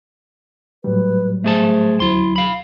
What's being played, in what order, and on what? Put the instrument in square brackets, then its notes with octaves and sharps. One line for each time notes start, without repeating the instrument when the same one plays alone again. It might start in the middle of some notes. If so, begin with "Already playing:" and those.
[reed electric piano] A2 F#3 G3 [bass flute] B4
[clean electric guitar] A3 G#4 A5 [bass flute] C5
[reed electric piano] D2 F#3 [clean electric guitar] E4 C6
[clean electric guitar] F5 B5